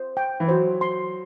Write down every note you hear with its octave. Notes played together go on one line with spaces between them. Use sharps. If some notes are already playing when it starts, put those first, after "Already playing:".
Already playing: C5
G5
E3
F#3 C5
C6